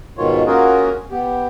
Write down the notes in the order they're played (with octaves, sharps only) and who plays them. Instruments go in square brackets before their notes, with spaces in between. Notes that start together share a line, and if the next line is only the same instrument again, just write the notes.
[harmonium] G#2 B2 D#3 F4 C#5
A#3 C#4 F4 F#4 G#4 A#4
B3 G4